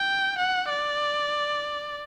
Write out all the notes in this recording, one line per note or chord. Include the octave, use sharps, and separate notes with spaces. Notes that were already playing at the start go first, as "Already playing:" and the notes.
Already playing: G5
F#5
D5